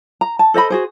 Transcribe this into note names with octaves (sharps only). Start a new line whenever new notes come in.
A#5
A5
A4 C5 D#5 B5
F#4 G#4 C5